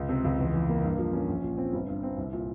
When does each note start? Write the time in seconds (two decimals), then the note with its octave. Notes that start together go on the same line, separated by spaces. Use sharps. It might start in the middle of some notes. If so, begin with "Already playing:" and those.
Already playing: C#2
0.09 C3
0.24 C#2
0.38 E2
0.54 E3
0.69 A#3
0.84 G2
0.98 F3
1.13 C#4
1.28 A#1
1.43 A#2
1.58 C4
1.73 G1
1.88 G2
2.03 C4
2.18 C2
2.33 A#2